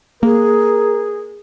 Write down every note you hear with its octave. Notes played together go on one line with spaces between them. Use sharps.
A#3 G#4 A#4